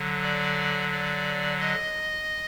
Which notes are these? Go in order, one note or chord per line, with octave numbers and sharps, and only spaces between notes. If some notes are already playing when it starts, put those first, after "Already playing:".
Already playing: D3 F#3
D5
D5
D#5